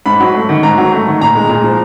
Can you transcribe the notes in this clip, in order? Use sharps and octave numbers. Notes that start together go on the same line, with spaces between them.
G#2 B5
F#3
A3
D#3
G#2 A#5
F#3
A3
D#3
A#2 A#5
G#3
A#2
F3